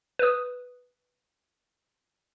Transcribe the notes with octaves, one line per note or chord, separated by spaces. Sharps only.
B4 D#6